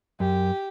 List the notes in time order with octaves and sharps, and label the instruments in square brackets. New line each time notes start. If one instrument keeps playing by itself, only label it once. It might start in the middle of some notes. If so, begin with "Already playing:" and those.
[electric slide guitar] F#2 [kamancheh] G4